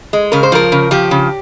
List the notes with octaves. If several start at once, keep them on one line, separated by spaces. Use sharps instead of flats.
G#3
C#3 A#4
C5
F3 A#4
C#3
F3 G4
C#3